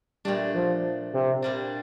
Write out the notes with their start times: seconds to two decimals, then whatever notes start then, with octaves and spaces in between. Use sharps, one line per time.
0.25 A#2 G3 A3 D4
0.55 F3
1.14 C3
1.42 A#2 G3 D4